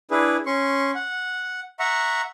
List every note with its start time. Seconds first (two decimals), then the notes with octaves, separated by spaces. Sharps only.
0.11 D4 E4 G#4 B4
0.46 C#4 C6 C#6
0.95 F#5
1.79 E5 F#5 A#5 C#6